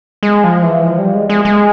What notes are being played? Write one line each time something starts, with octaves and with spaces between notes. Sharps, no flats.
G#3
F3
E3
F3
G3
G#3
G#3
G#3